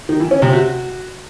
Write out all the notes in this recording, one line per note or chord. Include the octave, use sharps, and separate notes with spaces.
D#3
E3
C#4
C3
F#4